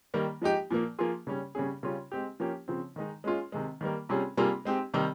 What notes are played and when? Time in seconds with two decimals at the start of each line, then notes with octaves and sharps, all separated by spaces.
0.14 D#3 G3 A#3
0.42 F3 G#3 D#4 G4
0.70 A#2 F3 A#3
0.99 F3 A#3 F4 G#4
1.27 C#3 G3 C#4
1.55 C#3 G3 C#4 G#4
1.83 C#3 G3 C#4 F4
2.12 G#3 C4 G4
2.40 F3 A#3 C#4 G4
2.68 C#3 F3 C4
2.96 D#3 G#3 D#4
3.24 G#3 C#4 F4 G#4
3.52 C3 D#3 G#3
3.81 D#3 G3 A#3
4.09 C3 G3 C#4 F4 G#4
4.37 C3 G3 A#3 F4 G#4
4.65 G#3 C4 D#4 G4
4.94 C3 D#3 G3